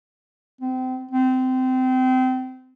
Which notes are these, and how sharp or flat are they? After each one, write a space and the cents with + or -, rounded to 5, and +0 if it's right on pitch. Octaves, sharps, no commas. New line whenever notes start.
C4 -30
C4 -25